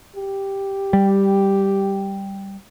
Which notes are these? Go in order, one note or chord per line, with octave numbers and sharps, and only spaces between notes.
G4
G3